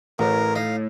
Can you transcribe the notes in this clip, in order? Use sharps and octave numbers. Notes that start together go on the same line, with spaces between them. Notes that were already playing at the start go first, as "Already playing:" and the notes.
A1 A2 A#4
D#4 F5